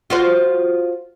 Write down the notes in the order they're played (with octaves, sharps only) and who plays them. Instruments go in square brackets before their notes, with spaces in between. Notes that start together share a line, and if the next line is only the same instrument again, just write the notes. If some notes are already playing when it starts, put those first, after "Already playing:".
[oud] F4 F#4 C5